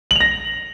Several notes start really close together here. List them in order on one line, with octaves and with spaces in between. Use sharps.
F#7 F7 A#6